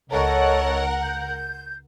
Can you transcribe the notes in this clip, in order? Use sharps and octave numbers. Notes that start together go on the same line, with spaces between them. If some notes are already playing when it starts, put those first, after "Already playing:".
C#2 A4 A#4 C#5 D#5 F#5
G6